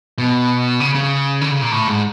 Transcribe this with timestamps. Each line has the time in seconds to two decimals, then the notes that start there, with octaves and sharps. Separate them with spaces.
0.18 B2
0.80 C#3
0.95 C#3
1.41 D3
1.51 C#3
1.61 A#2
1.72 A2
1.88 G#2